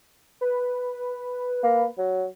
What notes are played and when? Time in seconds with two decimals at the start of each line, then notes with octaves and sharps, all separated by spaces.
0.41 B4
1.63 A#3
1.98 F#3